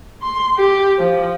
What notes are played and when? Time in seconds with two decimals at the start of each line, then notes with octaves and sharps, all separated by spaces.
0.22 C6
0.58 G4
0.99 F3